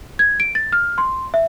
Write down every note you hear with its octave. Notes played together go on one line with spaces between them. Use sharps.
G#6
D7
A6
F6
C6
E5